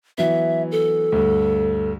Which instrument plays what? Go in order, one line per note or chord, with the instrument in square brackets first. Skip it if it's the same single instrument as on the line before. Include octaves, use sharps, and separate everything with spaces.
[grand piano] E3 F#3 B3 [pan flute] E5
[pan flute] A4
[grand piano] D2 G2